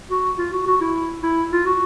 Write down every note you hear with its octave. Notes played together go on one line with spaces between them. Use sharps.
F#4
F4
F#4
F#4
E4
E4
F4
F#4